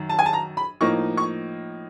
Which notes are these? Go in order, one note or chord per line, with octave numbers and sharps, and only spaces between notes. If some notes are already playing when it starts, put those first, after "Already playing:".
Already playing: F#2 D#3
A5
G#5
A5
A#5
B5
A2 F3 A#3 D#4 C#6
C#6